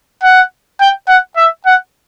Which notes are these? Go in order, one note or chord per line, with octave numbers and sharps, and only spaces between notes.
F#5
G5
F#5
E5
F#5